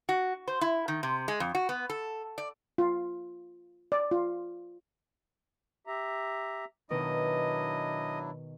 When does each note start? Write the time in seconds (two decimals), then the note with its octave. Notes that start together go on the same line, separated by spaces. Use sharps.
0.09 F#4
0.48 C5
0.61 E4
0.88 D#3
1.03 C3
1.28 G#3
1.40 F2
1.55 F#4
1.69 B3
1.90 A4
2.38 D5
2.78 F4
3.92 D5
4.11 F4
5.87 G4 E5 A#5
6.90 B2 D#3 F#3 D4 E4 D#5